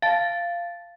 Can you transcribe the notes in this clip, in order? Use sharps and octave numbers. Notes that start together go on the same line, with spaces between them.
F5 A5 A6